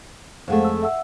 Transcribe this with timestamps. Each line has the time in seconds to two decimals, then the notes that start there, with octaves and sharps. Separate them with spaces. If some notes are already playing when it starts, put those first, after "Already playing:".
0.48 F2 G#3 A3 C5 F5 F#5
0.65 E6
0.82 E5 F#5 E6